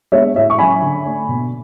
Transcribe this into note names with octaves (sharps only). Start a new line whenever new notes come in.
G#3 B3 D4 C#5 E5
A2 C#5 E5
C#6
F#3 C#4 G#5 B5
D3
A3 D4
B2